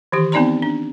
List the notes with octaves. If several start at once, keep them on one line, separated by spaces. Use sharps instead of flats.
D#3 E3 G4
B3 C4 D#4 D5 A#5 C6
D4